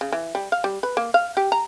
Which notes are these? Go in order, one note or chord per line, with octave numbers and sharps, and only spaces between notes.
C#3
E3
G3
F5
G3
B4
A#3
F5
G4
A#5